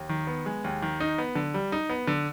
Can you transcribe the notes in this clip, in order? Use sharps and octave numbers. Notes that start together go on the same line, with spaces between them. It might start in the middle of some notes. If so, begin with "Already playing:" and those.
Already playing: D#2
D#3
B3
G#3
D#2
D#3
D#4
B3
D3
G3
D#4
B3
D3